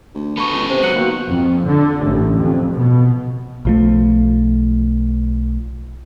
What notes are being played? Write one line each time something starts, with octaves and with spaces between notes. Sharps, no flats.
D2
B3 A4 B5 C#6
C#2
C3 C5
F#3 F#6 C#7 F#7
D#3 A#3 B3 F#4
F2
D3
A1
F2
B2
B1 F3 A3